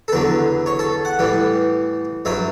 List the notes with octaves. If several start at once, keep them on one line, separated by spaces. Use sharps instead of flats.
A4
E2 D3 F#3 B4
C#5
A4
F#5
A2 E3 G3
G2 F#3 E5